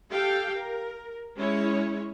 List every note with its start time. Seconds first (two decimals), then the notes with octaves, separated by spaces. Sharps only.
0.10 G4 A4 F5 G5
0.53 A#4
1.37 G#3 C#4 E4 C#5